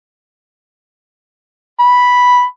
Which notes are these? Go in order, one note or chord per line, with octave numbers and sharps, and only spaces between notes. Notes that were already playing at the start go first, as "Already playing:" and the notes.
B5